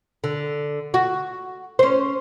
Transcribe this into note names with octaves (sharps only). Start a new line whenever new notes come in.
D3
F#4
C#4 C5